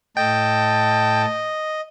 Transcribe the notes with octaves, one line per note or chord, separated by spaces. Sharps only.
A2 A4 D#5 G5 A5